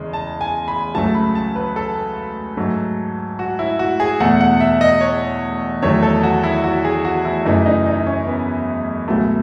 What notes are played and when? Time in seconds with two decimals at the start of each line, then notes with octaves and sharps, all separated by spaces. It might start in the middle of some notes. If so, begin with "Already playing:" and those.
Already playing: E2 C#3 G#3
0.13 A5
0.41 G#5
0.68 B5
0.95 C#2 C#3 F#3 A3 A5
1.15 B5
1.35 A5
1.56 B4
1.76 A4
2.57 G#2 F#3 A3
3.39 F#4
3.59 E4
3.79 F#4
4.00 G#4
4.20 E2 B2 A3 F#5
4.41 F#5
4.61 E5
4.81 D#5
5.01 C#5
5.82 E2 D#3 F#3 A3 C#5
6.03 A4
6.23 F#4
6.43 E4
6.64 F#4
6.85 G#4
7.05 F#4
7.25 E4
7.45 F#2 C#3 E3 A3 D#4
7.66 D#4
7.86 D#4
8.06 C#4
8.27 B3
9.08 C#2 B2 F#3 A3